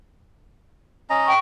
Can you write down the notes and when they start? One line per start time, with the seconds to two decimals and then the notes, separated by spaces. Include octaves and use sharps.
1.10 C#4 D#5 A#5
1.25 G5 C#6